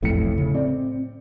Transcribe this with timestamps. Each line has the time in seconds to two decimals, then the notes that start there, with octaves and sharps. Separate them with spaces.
0.03 E1 B1 F2 A2 C#7
0.38 C#3
0.55 C4 D5